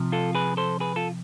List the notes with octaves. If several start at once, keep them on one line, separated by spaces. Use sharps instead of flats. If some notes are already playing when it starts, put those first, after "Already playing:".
Already playing: C3 F3
F4 A4
G#4 B4
A4 C5
G#4 B4
F4 A4